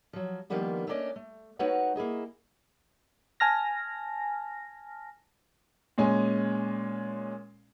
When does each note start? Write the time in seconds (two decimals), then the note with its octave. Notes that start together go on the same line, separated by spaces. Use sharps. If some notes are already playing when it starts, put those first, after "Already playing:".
0.13 F3 F#3
0.50 D#3 F3 G3 A#3 B3 D4
0.87 A3 A#3 C#4 D4 D5 D#5
1.16 A3
1.59 A3 D#4 F#4 B4 C#5 F#5
1.96 A#3 E4 G#4 D#5
3.40 G#5 A5 F6 A#6
5.98 A#2 G#3 C#4 G#5